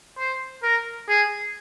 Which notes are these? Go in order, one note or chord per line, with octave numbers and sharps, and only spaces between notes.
C5
A#4
G#4